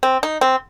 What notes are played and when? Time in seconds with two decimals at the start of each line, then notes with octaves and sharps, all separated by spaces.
0.03 C4
0.23 D#4
0.41 C4